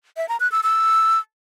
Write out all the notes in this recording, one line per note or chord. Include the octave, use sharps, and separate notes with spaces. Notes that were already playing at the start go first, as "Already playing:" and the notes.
E5
A#5
F#6
E6
E6